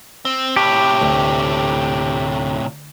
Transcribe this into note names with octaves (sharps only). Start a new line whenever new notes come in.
C4
A2 C3 G4
D2